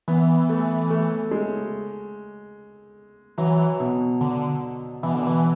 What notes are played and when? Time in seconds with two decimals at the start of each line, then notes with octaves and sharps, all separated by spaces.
0.08 E3 B3
0.49 A3
0.90 A3
1.31 G#3
3.38 E3 F#3
3.80 B2
4.21 D3
5.03 B2 E3
5.14 D3
5.27 E3